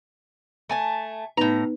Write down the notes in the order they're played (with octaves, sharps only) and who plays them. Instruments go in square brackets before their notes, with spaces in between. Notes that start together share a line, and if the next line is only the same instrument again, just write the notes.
[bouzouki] A3 G#5 A5
[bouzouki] A2 A#5 [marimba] B3 D#4 B4